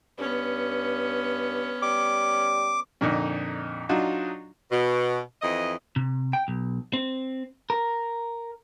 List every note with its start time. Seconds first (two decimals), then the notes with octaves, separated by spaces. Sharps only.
0.18 G2 B3 C#4
1.82 G3 D6
3.01 F2 A#2 D3 D#4
3.89 F#3 D4 D#4 F4 F#4
4.71 B2
5.42 F2 E3 D#5
5.96 C3
6.33 G5
6.48 B1
6.93 C4
7.70 A#4